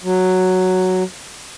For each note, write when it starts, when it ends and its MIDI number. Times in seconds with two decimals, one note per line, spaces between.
0.04 1.03 54